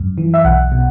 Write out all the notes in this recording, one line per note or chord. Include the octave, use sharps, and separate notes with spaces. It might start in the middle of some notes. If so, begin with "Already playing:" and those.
Already playing: F#2
E3
E5
B1 F#5
B2